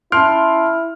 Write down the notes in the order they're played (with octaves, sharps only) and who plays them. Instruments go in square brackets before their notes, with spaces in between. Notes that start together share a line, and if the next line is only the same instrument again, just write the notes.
[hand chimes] C#4 A5 D7 [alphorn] E4 [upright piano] C6 F6